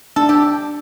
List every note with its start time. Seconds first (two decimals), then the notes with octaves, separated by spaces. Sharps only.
0.16 D4 A4
0.29 G4